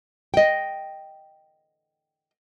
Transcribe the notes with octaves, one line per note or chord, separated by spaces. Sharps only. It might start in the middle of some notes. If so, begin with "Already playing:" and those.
D#5 G5